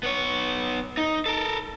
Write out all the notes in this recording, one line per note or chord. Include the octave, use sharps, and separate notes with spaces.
B3 C#5
D#4
A4 A#4